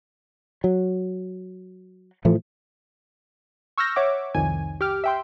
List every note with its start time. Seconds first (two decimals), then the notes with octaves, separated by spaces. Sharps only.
0.64 F#3
2.25 A2 E3 F3 A3
3.78 C#6 E6 F6 G6 A#6
3.96 C#5 E5 F#5 D6
4.35 C2 F2 D#3 G#5
4.81 G4 D6 F6
5.04 E5 G5 C6